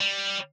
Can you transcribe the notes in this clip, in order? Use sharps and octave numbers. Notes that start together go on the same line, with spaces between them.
G3